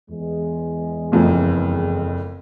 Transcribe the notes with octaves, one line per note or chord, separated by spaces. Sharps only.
E2 G#3
F#1 F2 E3